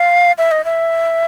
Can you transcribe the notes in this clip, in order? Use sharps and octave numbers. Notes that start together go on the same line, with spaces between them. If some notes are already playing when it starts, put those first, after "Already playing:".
Already playing: F5
E5
D#5
E5